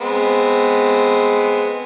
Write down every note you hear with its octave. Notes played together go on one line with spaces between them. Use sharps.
G#3 B3 C4